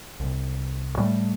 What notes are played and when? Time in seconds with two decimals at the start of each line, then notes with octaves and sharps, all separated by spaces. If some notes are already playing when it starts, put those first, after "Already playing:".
0.20 C2
0.96 A2 G3 A3